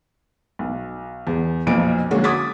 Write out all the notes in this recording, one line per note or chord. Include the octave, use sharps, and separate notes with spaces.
B1
E2
B1 F2 A#2 D7
D3 F#3 G#3 A#3 C#4 F#4
D6 D#6 G#6 A6 B6